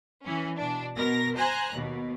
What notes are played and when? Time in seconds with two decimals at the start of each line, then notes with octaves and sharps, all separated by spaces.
0.24 E3 C#4
0.57 B2 D4
0.96 B2 A#4 A#6
1.36 C5 G#5 A#5 F#6
1.72 D#2 B2